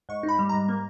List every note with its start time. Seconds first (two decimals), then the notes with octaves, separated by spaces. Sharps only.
0.09 G#2 C#6
0.23 D#4
0.29 B5
0.39 G3
0.49 G#2 A#5
0.69 A#3